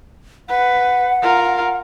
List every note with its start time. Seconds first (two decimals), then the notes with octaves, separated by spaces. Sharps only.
0.49 B4 F#5
1.22 F4 A#4